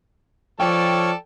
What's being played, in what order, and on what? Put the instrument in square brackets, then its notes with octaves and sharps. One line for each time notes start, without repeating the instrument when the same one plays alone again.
[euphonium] F3 [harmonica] A4 D5 [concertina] C#5 C#6 F6 [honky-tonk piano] G5